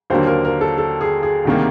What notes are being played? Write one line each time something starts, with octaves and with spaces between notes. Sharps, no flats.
D#2 D3 F#3 A#3 C5
A#4
A#4
A4
A4
G#4
G#4
D2 C3 D#3 G3 A#3